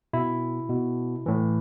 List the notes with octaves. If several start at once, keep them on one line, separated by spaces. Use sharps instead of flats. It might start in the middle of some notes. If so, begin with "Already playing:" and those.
B2 E4
B2
A2 E3